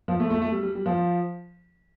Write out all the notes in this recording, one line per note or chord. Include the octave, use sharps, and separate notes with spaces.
F3
A3
A3
A3
G3
G3
G3
F3